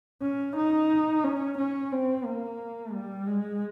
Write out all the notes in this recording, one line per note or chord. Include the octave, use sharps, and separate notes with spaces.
C#4
D#4
C#4
C#4
C4
A#3
G3
G#3